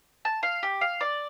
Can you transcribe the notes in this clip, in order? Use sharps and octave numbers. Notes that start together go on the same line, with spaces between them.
A5
F5
G4
F5
D5